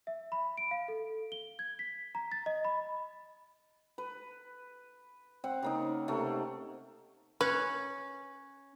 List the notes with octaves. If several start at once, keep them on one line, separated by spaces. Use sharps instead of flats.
E5
B5
D7
F5
A4
G7
G#6
B6
A#5
A6
D#5
B5
B4
C4 F#5
C#3 A#3 D#4
C3 A3 A#3
C#4 B4